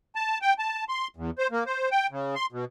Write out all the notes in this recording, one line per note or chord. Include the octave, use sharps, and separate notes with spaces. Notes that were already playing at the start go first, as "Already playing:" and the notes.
A5
G5
A5
C6
E2
C5
A#3
C5
G5
C#3
C6
B2